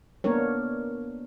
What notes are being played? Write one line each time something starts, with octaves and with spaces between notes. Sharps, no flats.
A#3 B3 D4 A#4 C#5